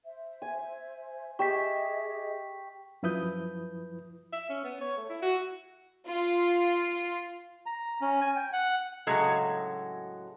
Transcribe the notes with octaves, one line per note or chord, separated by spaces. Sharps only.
C5 E5
G#5
G4 G#4 D#5 E5 C#6 E6 B6
F#2 F3 E4 B4 D#6 G6
E5
C#4
B3
C#5
A3
E4
F#4
F4
A#5
C#4
G#5
G5
F#5
A2 C#3 F#3 G#3 F#4 A4